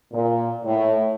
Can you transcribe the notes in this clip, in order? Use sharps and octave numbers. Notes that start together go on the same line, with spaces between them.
A#2
A2